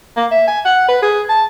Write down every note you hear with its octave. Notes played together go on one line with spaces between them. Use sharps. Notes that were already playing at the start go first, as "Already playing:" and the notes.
A#3
E5
G#5
F#5
B4
G#4
A5